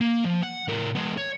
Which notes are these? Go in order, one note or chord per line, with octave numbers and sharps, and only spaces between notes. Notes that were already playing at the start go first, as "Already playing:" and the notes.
A#3
F3
F#5
A2 A#4
G#3 B3
C#5